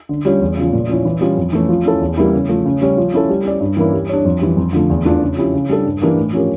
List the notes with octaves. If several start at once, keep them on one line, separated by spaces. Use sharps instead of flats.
D3
G3 C#4 F4 C#5
E2
C#3 F3
A#2
F3 C#4 E4
E3
G3 C#4 F4
F2
E3 A3 C#4
F3
C#4 E4 A4
E2
E3 G3 A#3 E4
C#3
F3 A3
C#3
G3 C#4
F3
C#4 E4 A4
G3
C#4 G4 D5
G2
E3 A#3 C#4 E4
G3
D4 G4 C#5
F2
E3 G3
F2
D3 F3 A3
E2
E3 A3 D4 F4
C#3
F3 C#4 E4 G4
C#3
G3 D4 A4
G2
E3 G3 A#3 D4
A2
F3 C#4 G4 A#4